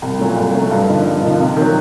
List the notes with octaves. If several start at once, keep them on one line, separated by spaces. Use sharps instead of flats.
C2
A#2 F#3 A3
C2
A#2 F#3 A3
G2
D3 F3 A#3 D#4
G2
D3 F3 A#3 D#4
C3
D#3 F#3